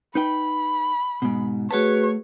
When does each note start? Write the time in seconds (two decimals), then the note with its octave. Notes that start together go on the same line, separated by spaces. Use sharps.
0.15 D#4 B4 G5 B5
1.22 G#2 B2
1.71 A3 F#4 G#4 B4 C#5 F#5 A5